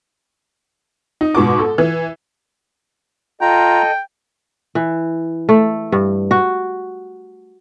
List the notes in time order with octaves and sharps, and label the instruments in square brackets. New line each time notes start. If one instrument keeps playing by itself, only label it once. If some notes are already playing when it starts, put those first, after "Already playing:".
[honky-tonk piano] D#4
G#2 B2 C#6 D6
A4
E3
[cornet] F4 [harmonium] A4 D#5 [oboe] G5 [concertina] A#5
[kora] E3
A3
G2
F#4